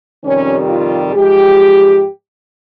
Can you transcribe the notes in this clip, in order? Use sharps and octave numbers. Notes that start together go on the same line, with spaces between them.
F2 C3 D#3 G3 C#4
F4
G#2 F3 G#3 G4